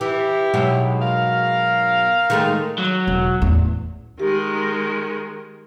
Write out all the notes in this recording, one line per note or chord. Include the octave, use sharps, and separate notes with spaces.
E3 E4 G4
G#2 B2 F#3
A#4 F5
D#3 G#3 A3
F#3
E1
E2 A2
D#3 G#3 G4